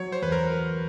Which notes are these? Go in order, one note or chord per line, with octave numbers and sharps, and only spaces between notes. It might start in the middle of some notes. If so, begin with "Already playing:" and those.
Already playing: F#3 C#5
C5
E2 B4
A#4